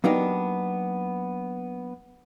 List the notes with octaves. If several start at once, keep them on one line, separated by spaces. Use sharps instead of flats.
F#3 A#3 B3 D4 D#4 G4